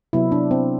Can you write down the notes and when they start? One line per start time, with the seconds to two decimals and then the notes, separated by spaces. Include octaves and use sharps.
0.13 C3 F#3 B3 E4
0.32 D4
0.51 C4